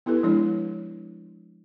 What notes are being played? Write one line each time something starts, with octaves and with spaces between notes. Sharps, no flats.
B3 E4 G4 A4 B4
F3 G#3 D4 E4 C#5